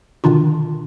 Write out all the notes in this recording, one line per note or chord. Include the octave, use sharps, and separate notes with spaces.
B2 D3 D#3 D4 F4